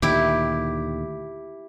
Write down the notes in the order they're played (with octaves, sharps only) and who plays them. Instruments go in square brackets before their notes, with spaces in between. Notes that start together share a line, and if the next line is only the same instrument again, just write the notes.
[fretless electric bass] D2 A#2 D#3 [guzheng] E4 G4